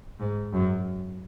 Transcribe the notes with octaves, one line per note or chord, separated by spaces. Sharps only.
G#2
F#2